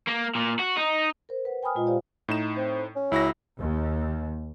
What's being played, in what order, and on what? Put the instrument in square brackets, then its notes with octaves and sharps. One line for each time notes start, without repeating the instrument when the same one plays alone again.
[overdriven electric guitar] A#3
A#2
F#4
D#4
[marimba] A#4 C5
B4 F#5
G5 G#5 B5 D#6 F6
A#2 G#3 F4 D#5 A#5 D#6
F4 G4 C5 D5 F5
[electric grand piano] A2 D#4 E7
[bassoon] C4
C#4
[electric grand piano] C#2 F#4 A#6 [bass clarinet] E4
[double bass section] D#2